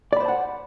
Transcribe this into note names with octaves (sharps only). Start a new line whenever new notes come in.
C5 D5 F#5 A5 B5